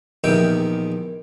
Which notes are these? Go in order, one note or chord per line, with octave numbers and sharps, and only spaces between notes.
A#1 E2 D#3 G4 E5 G5